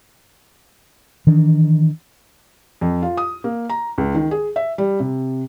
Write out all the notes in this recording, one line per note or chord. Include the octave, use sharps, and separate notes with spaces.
D#3 E3 D4
F2
F4
D#6
A#3
A#5
C#2
D#3
G#4
E5
G3
C3